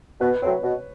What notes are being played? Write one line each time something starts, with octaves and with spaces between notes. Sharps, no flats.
B2 B4
F#3 A3 C4 C#5
B2